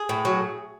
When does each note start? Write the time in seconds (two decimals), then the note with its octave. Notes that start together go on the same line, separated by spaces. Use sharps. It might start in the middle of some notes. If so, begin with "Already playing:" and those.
Already playing: G#4
0.09 A2
0.25 F#3